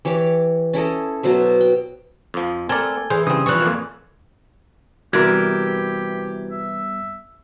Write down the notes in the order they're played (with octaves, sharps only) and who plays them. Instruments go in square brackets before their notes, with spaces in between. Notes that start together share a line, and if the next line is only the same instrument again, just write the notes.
[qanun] E3 G4 C#5 D6
C#4 E4 A4 D#5
B2 F#3 C5 E5
G5
[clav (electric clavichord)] F2 F3
[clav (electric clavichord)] C4 A#4 D5 [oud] A4 [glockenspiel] G#5 G#6 G7
[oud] E3 [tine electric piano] G#4 [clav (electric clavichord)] C5
[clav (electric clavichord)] G2 C4 [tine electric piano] C#3 D#6
[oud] E3 F3 [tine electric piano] C#6 F#6
[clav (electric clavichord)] F2 A#2
[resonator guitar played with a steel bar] C3 E3 A#4 [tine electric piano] G3 B3 [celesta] F#4 G#6 [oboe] G4
[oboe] E5